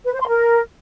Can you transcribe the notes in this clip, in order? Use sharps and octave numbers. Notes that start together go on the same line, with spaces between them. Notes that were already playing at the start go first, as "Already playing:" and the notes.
B4
C5
C6
A#4